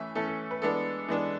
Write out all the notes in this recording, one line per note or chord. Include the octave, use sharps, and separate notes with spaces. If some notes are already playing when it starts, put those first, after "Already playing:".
Already playing: E3 A3 C#4 E5
E3 A3 C#4 A4
A4
B4
E3 G#3 B3 D4 A4
E3 G#3 B3 D4